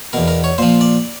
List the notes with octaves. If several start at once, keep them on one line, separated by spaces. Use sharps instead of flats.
E2 B2 A#4
A#4
C#5
A#2 F3 C5
D5